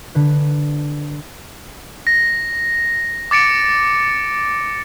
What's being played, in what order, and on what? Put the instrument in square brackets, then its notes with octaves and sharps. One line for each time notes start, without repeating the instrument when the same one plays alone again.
[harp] D3 B4
[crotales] A#6
D6 A6 C#7 D7